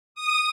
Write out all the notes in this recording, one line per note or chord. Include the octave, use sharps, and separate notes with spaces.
D#6